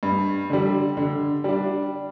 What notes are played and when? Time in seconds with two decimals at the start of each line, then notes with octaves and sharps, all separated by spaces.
0.03 G2
0.50 D3 G3
0.97 D3
1.44 G3 D4